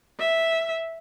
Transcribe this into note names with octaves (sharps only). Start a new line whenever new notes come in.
E5